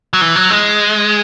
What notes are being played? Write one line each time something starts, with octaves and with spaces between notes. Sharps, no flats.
F#3
E3
F#3
G#3